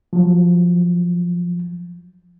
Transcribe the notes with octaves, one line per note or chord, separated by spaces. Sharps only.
F3 F#3